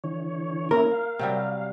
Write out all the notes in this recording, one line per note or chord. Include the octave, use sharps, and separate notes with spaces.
D3 E3 C#5
A#3 C#4 E4 A#4
F5
C3 F#3 G3